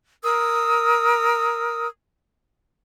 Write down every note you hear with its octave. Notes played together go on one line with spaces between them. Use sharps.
A#4 D#6 E6